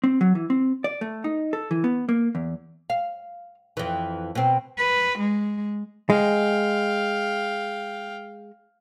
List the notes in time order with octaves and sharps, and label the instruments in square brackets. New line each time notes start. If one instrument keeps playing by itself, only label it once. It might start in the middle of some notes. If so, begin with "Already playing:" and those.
[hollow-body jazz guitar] C4
F#3
E3
C4
D5
A3
D#4
A4
E3
B3
A#3
E2
[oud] F5
F2 E3
B2 C4
[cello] B4
G#3
[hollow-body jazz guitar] G#3 [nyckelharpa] F5 G5